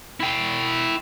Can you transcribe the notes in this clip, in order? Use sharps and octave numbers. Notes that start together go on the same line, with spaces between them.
E4 G5